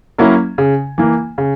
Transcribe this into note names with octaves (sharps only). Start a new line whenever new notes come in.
F#3 A#3 C#4 E4
C#3
E3 A#3
C#3